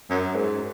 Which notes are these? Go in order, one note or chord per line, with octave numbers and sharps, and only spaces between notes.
F#2
G#2